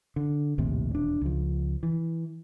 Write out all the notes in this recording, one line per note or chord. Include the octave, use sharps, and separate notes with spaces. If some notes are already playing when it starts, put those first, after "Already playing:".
D3
A#1 D#2 A2 C3
E1 D4
C#2 F3
E3